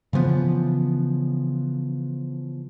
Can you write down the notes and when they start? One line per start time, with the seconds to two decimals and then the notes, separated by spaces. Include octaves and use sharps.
0.13 C#3 E3 F3 B3